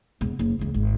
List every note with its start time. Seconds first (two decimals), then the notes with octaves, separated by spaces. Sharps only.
0.21 E1 B3
0.39 F#1
0.59 C#2 E3
0.74 G#1